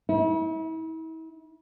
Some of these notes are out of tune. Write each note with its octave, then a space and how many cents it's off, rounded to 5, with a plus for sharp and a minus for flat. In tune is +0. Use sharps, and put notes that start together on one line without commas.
E4 -40